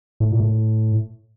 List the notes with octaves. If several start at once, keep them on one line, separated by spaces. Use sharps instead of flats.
A2
A#2
A2